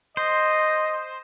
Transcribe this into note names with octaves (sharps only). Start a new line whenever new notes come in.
C5 D#5